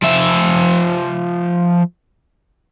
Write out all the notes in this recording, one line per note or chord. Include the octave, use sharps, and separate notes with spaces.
F3 E5